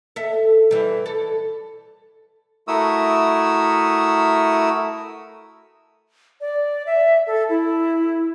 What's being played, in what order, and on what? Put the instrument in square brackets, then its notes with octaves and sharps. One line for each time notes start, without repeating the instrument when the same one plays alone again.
[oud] A4 E5
E3 G3
A4
[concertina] A3 E4 F#4 A#4 D#6 E6
[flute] D5
E5
A4
E4